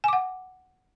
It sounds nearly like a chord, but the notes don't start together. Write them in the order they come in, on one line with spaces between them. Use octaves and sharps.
G#5 D6 F#5